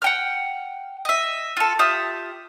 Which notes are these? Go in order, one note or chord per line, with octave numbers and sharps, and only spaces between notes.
F#5 G5 F6
D#5 E5
F4 A4
F4 G4 E5 D#6